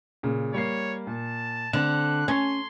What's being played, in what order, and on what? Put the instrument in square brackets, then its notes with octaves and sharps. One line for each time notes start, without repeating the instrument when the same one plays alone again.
[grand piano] A#2 C#3
[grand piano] G3 A#3 C7 [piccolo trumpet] C#5
[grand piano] A#2 [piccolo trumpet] A5
[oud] D3 [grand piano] C4 E7 [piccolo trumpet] F#6
[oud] C#4 [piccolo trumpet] C6 [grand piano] C#6 G#6